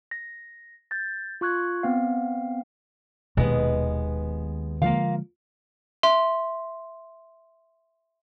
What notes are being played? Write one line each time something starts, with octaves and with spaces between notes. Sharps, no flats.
A#6
G6 A6
F4 C#6 F#6 G#6
B3 C4 F5
D#1 D#2 B2 G#3 B3 D#5
D3 F3 G#3 A#3 F4 F5
E5 C6